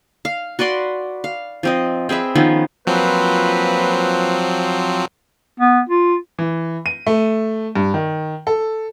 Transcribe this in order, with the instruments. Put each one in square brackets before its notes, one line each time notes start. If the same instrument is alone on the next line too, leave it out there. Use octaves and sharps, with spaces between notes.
[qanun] F5
F#4 B4 D5 C6
F5
F3 C4 D#5
C4 G#4 B4 E5
D#3 F3 B3 C#4
[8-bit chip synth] F3 F#3 C4 [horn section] A#3 F4 B4
[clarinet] B3
F4
[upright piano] E3
D#7
A3
G2
D#3
A4